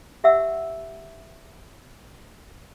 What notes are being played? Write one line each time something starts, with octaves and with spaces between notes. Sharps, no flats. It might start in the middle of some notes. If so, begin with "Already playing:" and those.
G4 E5 F#5 E6